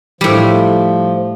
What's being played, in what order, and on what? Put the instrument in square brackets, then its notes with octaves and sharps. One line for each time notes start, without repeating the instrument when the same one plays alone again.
[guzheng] A2 G3 [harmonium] F3